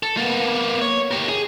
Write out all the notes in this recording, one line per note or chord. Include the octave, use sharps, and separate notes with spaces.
A4
A#3 B3
C#5
G4 A#4
G#4